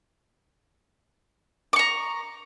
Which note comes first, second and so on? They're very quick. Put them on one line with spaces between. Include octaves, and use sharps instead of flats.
D6 C#6 A#5